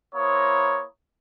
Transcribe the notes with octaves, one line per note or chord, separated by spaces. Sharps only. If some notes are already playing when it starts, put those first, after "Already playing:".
A#3 E4 C5 C#5 A#5 D#6